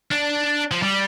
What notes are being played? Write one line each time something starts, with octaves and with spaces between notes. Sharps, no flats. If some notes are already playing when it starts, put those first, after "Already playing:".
D4
F3
G3